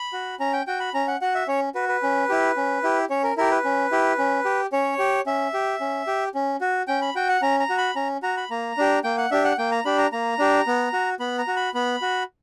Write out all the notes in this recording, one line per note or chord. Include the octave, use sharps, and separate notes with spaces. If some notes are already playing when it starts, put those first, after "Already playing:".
Already playing: B5
F#4
C#4 A#5
G5
F#4 G5
B5
C#4 A#5
F#5
F#4 F#5
E5
C#4 C#5
F#4 B4
B4
C#4
E4 G4
C#4
E4 G4
C#4 C#5
A#4
E4 G4 A#4
B4
C#4
E4 G4
C#4
G4
C#4 C#5
G4
C#4 E5
G4
C#4
G4
C#4
F#4
C#4 G5
B5
F#4 G5
F#5
C#4 A#5
A#5
F#4
B5
C#4 A#5
F#4 A#5
B5
A#3 A#5
D4 G4
A#3 G5
F#5
D4 G4 E5
F#5
A#3 G5
A#5
D4 G4 B5
A#5
A#3 A#5
D4 G4
B3
F#4
B3 B5
A#5
F#4
B5
B3 B5
F#4